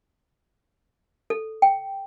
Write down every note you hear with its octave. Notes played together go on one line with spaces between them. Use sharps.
A4
G5